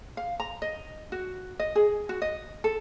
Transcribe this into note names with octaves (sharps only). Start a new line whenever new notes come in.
F5
A#5
D#5
F#4
D#5
G#4
F#4
D#5
A4